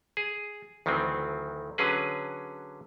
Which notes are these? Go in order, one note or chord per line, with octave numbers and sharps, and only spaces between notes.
G#4
D2 D#3 E3 F#3 C4
D3 F#3 C#4 G#4 B4